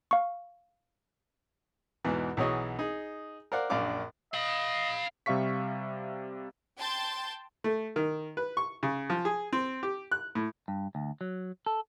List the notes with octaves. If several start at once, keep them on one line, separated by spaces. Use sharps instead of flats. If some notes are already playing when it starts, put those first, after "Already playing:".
F5 C#6
E2 G#2 B2 E3
B1 E3 F#3 G#4 C#5 D#5
D#4 G#4
A#4 C5 D5 F5 F#5
A#1 F#2 D4 F5 D6 F6
D#5 F5 B5
C3 G3 E5 F5 C#6 B6
G5 A5 C6 G6 A6
A3
D#3
B4
C#6
C#3
F3
G#4
C4
G4
F#6
A2
G2
D2
F#3
A4